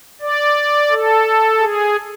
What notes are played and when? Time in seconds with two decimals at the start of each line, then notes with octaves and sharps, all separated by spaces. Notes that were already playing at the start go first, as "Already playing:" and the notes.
0.21 D5
0.91 A4
1.60 G#4